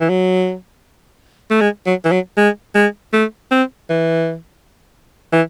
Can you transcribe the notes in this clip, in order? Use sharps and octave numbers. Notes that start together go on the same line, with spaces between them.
E3
F#3
A3
G#3
F#3
E3
F#3
G#3
G#3
A3
C4
E3
E3